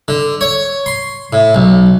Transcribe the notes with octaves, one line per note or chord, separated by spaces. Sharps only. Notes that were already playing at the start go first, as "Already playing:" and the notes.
D3
C#5
C6
A2
B1